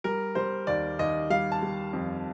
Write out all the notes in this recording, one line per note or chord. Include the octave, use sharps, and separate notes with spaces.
G3 A#4
G3 C5
D#2 D5
D#2 D#5
G3 F5
A5
G3
F2